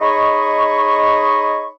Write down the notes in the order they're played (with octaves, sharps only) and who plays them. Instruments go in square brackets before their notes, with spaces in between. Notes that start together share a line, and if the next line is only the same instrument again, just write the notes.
[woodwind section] D#4 G#4 C#5 D#5 B5 C#6